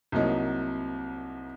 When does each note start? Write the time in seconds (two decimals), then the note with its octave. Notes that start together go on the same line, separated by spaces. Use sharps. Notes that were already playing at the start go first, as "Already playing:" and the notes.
0.12 C2 C3 F#3 A#3 D#4